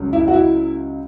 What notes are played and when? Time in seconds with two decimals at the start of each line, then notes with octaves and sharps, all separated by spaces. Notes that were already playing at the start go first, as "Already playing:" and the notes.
Already playing: C#2 C#3 F#3
0.13 E4
0.28 F#4
0.33 E4